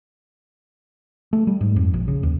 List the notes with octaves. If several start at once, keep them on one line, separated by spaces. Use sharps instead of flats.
A3
G3
G#2
F2
A#1
C#3
D#2